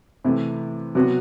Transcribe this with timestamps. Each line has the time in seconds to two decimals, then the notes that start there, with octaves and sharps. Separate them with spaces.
0.24 C3 E3 A3 E4
0.95 C3 F#3 B3 F#4